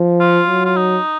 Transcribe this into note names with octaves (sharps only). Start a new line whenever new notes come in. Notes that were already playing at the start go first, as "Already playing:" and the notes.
Already playing: F3
F4
F#3
F4
D#4